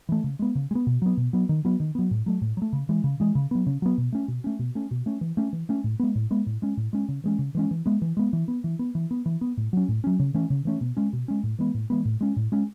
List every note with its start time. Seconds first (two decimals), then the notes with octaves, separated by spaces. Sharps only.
0.09 E3 A3
0.24 C#3
0.39 G#3 B3
0.55 C#3
0.71 G#3
0.75 B3
0.87 B2
1.02 F#3 B3
1.17 B2
1.33 F#3 B3
1.49 D#3
1.65 F#3 B3
1.80 D#3
1.95 F#3 B3
2.11 A2
2.26 F#3 A3
2.42 A2
2.57 F#3
2.62 A3
2.73 C#3
2.89 E3 G#3
3.04 C#3
3.20 E3 G#3
3.35 C#3
3.51 F#3 B3
3.67 C#3
3.82 F#3 B3
3.98 B2
4.13 A3 C#4
4.28 B2
4.44 A3 C#4
4.59 B2
4.75 A3 C#4
4.91 B2
5.06 A3 C#4
5.21 E3
5.37 A3 C#4
5.53 E3
5.69 A3 C#4
5.84 A2
6.00 G#3 B3
6.15 A2
6.31 G#3 B3
6.47 A2
6.62 G#3 C#4
6.77 A2
6.93 G#3 C#4
7.08 C#3
7.24 E3 G#3 C#4
7.39 C#3
7.55 E3 G#3 C#4
7.71 E3
7.86 G#3 B3
8.02 E3
8.17 G#3 B3
8.33 E3
8.48 B3
8.64 E3
8.79 B3
8.95 E3
9.11 B3
9.26 E3
9.41 B3
9.57 A2
9.73 F#3 C#4
9.89 A2
10.04 F#3 C#4
10.20 C#3
10.34 E3 A3 C#4
10.50 C#3
10.65 E3 A3 C#4
10.81 B2
10.97 G#3 C#4
11.13 B2
11.28 G#3 C#4
11.44 A2
11.59 E3 G#3 B3
11.74 A2
11.90 E3 G#3 B3
12.05 A2
12.21 G#3 C#4
12.37 A2
12.52 G#3 C#4